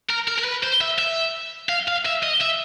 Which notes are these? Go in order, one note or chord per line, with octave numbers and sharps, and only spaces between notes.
A#4
A#4
A#4
B4
C5
E5
E5
F5
F5
E5
D#5
E5